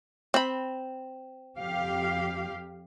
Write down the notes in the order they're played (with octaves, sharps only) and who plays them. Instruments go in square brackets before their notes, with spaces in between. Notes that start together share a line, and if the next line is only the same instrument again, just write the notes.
[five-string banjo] C4 B5
[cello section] F2 G4 F5